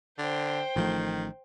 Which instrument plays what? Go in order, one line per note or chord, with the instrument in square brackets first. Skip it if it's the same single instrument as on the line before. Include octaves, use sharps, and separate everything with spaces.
[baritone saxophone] D3 [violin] C5 G5
[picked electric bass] A1 F3 A3 [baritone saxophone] D#3